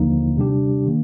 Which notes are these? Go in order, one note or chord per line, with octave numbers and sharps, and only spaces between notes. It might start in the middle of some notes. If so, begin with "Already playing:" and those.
Already playing: D#2 D3 F3 A#3 D#4
C3 G3 D4 G4
D#3 A#3